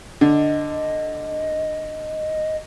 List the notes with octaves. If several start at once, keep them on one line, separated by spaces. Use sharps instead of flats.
D3 D#5